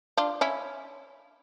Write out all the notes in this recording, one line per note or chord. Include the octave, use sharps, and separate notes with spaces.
D4 F4
C#4 E4